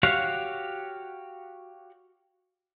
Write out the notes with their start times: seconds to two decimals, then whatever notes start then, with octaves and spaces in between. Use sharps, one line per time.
0.03 F#4 G4 C#5 F5 F#5